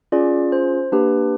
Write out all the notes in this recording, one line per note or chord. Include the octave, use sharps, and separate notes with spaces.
C#4 F4 G#4 D5
C5
A#3 D4 G4 B4